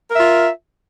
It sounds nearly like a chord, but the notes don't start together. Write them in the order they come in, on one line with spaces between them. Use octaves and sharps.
A#4 E5 F4